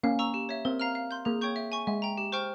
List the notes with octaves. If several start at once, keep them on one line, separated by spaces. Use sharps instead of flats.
A#3 C#4 F5
A#5 C#6 E6
G4
C#5 E5
C4 A#4
F5 A#5 F6
F5
C6 G6
A#3 G#4
C#5 G5 C#6 G6
E5
G#5 C#6
G#3 E5
G5 A#5
G4
C5 G5 C#6 F6